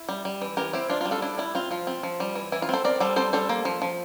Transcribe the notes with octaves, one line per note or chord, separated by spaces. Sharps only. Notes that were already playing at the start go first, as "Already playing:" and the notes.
Already playing: E4
G3
G3
E3
E3 G4 A#4
C4 E4 G4
D4 F4
F4
G3
F4 A4
D4 E4
G3 E4
C4 F4
F3 F4
C4
F3
G3
E3
E3 E4
F4
C4 A4 C5
C4 A#4 D5
G3 A4 C5
C4 A4 C5
G3 A4 C5
A#3
F3
F3